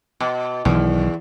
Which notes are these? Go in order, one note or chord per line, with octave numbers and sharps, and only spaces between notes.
B2
B1 E2 D#3